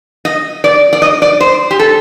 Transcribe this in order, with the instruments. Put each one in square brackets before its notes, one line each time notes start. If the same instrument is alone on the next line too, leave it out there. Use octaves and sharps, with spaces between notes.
[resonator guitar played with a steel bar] D#5
D5
D5
D#5
D5
C5
G4
A4